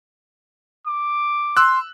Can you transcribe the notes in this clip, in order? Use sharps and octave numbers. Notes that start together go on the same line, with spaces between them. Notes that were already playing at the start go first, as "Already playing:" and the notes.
D6
C6 E6 F#6